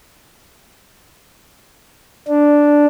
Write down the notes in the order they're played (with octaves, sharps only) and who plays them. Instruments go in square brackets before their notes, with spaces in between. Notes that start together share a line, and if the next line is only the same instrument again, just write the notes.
[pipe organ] D4